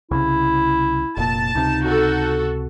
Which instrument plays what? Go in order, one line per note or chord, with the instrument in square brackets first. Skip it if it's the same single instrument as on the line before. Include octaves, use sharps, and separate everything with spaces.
[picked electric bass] C2 C#3 [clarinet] E4
[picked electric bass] F1 A#2 [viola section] A5
[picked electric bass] C#2 C3 [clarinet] D#4
[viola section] F#4 A4